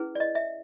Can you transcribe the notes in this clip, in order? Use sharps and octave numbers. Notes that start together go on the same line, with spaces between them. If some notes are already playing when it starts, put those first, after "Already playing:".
Already playing: C#4 E4 G#4 B4
D5
D#5
E5